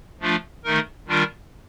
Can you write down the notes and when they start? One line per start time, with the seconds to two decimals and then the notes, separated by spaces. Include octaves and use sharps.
0.21 F3 A3 D4 F4
0.64 D#3 A3 D#4 A#4
1.08 D#3 G3 D4 F4 A#4